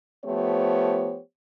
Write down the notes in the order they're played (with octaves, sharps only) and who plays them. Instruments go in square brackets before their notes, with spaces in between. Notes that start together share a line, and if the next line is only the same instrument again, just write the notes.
[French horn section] F3 A3 B3 G4 C5 C#5